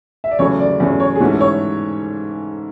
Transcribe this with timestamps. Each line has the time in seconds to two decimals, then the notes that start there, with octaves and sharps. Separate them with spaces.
0.24 E5
0.31 D5
0.39 E2 C#3 F#3 A3 C#4 C#5
0.60 D5
0.80 E2 C#3 F#3 A3 C#4
1.00 C#5
1.15 G#4
1.20 G#2 E3 A3 C#4 F#4
1.31 A4
1.41 C#5